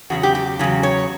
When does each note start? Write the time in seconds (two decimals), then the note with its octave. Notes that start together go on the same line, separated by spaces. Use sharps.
0.10 E2 C#3 F#3 F#4
0.23 G4
0.35 G4
0.59 E2 C#3 F#3
0.83 C#5